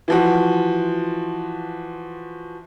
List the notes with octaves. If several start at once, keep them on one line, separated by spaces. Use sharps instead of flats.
E3 F3 F#4